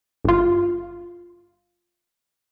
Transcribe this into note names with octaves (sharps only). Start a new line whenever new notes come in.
G1 F4